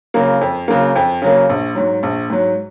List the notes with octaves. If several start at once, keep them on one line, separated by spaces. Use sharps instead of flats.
C#3 F#3 A#3
F2
C#3 F#3 A#3
F2
C#3 F#3 A#3
A#1
G#2 F#3
A#1
G#2 F#3